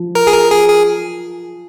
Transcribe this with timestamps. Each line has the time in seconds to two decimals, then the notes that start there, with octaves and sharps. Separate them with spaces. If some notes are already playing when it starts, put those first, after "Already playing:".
Already playing: F3
0.15 A#4
0.27 G#4
0.33 A#4
0.51 G#4
0.68 G#4